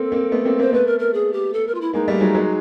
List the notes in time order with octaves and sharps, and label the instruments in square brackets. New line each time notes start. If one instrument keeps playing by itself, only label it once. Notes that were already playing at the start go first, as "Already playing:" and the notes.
Already playing: [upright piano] A#3 C4 [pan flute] A4
[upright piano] A#3 C4
A3 B3
A#3 C4
[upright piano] A#3 C4 [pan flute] C5
[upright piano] A3 B3 [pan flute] B4
[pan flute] A#4
A#4
G#4
G4
A4
A#4
F4
E4
[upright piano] G#3 A#3 [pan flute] D#4
[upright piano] G3 A3
[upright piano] F#3 G#3 [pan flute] D#4
[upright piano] F#3 G#3